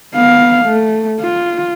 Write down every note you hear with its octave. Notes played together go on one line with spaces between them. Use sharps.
B3 F5
A3
F4